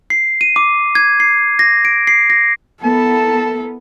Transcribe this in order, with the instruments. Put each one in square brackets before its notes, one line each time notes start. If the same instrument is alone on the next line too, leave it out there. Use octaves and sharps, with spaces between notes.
[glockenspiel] C7
D#7
D6
G#6
C7
A#6
D7
C7
A#6
[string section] B3 E4 A#4 [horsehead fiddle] A4 [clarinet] A5